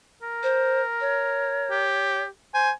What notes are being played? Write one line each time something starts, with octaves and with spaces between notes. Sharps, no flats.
A#4
C5
C#5
G4
C5 G#5